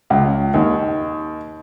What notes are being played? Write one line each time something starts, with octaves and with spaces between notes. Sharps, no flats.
C#2
D#2